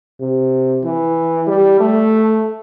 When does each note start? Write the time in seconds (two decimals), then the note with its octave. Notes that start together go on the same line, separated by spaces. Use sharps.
0.20 C3
0.84 E3
1.47 G3
1.80 A3